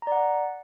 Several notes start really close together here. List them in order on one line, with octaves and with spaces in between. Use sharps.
A#5 D5 F#5